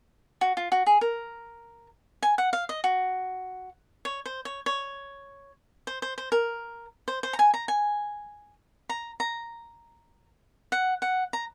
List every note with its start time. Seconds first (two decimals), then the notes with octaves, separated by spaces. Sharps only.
0.41 F#4
0.57 F4
0.72 F#4
0.87 G#4
1.01 A#4
2.23 G#5
2.38 F#5
2.53 F5
2.69 D#5
2.84 F#4
4.05 C#5
4.26 C5
4.45 C#5
4.66 C#5
5.87 C5
6.02 C5
6.18 C5
6.32 A#4
7.08 C5
7.23 C5
7.33 A#5
7.39 G#5
7.54 A#5
7.68 G#5
8.89 A#5
9.20 A#5
10.72 F#5
11.02 F#5
11.33 A#5